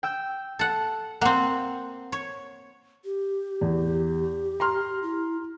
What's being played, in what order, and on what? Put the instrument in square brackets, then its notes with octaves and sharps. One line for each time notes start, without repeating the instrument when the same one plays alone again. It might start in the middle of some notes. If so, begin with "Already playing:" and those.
[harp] G5 E6 G6
[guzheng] A4 F#5
[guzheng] A#3 C4 [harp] F#5
[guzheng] C#5
[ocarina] G4
[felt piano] E2
A#5 C6 F6
[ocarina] E4